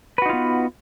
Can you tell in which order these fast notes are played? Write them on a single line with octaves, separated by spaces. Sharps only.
B4 F#4 D#4 F4 B3